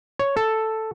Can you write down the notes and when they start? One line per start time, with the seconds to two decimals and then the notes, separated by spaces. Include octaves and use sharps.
0.19 C#5
0.37 A4